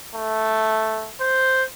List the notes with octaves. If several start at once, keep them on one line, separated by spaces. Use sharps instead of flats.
A3
C5